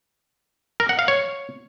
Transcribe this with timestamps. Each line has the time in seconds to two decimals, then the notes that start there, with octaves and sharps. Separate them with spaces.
0.80 A#4
0.89 F#5
0.99 F5
1.08 C#5